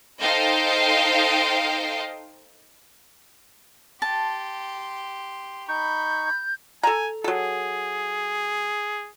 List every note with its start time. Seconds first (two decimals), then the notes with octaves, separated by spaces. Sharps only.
0.21 D#4 A4 C5 D#5 F5 G5
4.02 G4 A5 C6
5.68 D#4 B5 C#6 G6
6.83 A4 G#5 A#5
7.24 F#3 G#4 A4